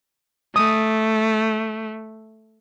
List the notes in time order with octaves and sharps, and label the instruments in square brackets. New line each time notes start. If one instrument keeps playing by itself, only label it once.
[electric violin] A3 [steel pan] D#6